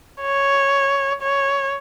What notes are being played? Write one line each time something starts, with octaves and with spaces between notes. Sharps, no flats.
C#5
C#5